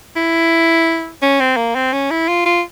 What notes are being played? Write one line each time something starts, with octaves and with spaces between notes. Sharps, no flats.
E4
C#4
C4
A#3
C4
C#4
E4
F4
F4